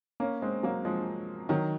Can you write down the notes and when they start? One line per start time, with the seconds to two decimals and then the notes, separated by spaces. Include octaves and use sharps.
0.20 A#3 C#4
0.42 G#3 C4
0.63 F#3 A#3
0.85 F3 G#3
1.49 D#3 F#3